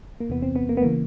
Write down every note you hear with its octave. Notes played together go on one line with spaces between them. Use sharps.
A#3
E2 C3 E3 B3
C4
B3
A#3
B3
C#3 E3 A#3